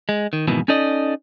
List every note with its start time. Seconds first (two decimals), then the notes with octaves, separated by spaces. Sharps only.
0.09 G#3
0.33 D#3
0.48 F2 G#2 B2 D#3 E3
0.68 C#4 D#4 A4 D5 D#5